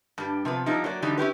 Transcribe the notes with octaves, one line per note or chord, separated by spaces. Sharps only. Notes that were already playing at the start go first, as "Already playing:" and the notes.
G2 G3
C3 F3 B3 B4
F3 G3 B3 D#4 E4
F#3 A#3 C5 D5
D3 E3 F#3 G3 D#4
C#4 E4 G4 B4